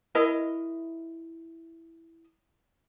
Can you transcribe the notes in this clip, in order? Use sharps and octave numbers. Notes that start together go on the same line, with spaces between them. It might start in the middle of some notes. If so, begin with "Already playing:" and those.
E4 A#4 D#5